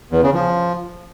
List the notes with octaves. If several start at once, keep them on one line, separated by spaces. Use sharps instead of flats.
E2
C#3
F3